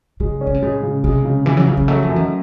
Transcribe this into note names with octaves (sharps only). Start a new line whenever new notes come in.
C#3 G#3
C#4
C#3
C3
A2 G#3
C#3
C3 G#3
C#3
C#3 E3
F#3
C#3 E3
E3
F#3 A3
E3
F#2
D#3